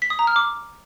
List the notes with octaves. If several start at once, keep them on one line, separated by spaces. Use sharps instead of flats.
B6
D#6
A#5
F6
D6